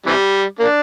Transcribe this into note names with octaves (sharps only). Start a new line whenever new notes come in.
C3 E3 G3
A#3 D4